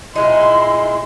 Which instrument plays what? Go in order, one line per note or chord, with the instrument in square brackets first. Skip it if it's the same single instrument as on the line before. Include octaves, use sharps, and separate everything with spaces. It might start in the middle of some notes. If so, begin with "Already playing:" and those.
[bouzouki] A#2 G#3 D#4 [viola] E4 C6